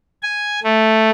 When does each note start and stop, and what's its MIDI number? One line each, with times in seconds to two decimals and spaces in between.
0.22 0.59 80
0.64 1.10 57